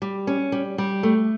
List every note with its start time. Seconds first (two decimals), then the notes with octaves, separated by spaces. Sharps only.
0.02 G3
0.27 C#4
0.52 G3
0.78 G3
1.03 A3